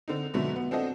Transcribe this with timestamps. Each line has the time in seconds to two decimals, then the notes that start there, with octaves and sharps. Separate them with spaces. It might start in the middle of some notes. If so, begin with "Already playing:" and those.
0.08 D3 C4 D#4
0.34 G#2 B2 D3 F#3 A3
0.56 B3
0.71 C4 D4 F#4 A4 D#5